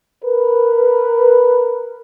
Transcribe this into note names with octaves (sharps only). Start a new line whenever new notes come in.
A#4 B4